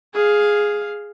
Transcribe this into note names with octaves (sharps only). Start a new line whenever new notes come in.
G#4 F5